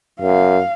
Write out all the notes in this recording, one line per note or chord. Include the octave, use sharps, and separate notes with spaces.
F#2 F5